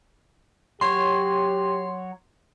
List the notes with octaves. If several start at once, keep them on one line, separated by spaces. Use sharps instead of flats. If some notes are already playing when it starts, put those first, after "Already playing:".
F#3 G4 C#5 C6